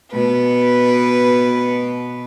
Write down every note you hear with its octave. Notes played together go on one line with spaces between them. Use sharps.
B2 B4